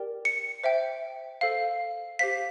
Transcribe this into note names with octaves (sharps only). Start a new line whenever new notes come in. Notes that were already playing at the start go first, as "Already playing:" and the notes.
Already playing: G4 A#4 D5 G5
C#7
C5 E5 G5
A4 C5 F5
G4 C5 F5 B6